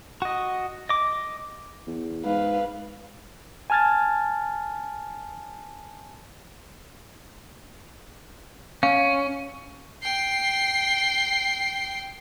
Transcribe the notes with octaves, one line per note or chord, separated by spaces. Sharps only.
F#4 D#5
D#5 D6
E2
G#2 B4 F5
G#5 A5 F6 G#6 A6
C#4 F5
G5 C7